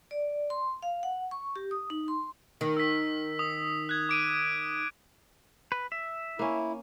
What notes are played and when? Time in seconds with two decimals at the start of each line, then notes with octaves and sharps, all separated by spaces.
0.11 D5
0.50 C6
0.82 F5
1.03 F#5
1.31 C#6
1.56 G4
1.71 D#6
1.90 D#4
2.08 C6
2.61 D#3
2.77 E6 B6
3.39 D#6
3.89 F#6 G#6
4.09 D6 D7 D#7
5.72 B4
5.92 E5
6.39 A#3 C#4 E4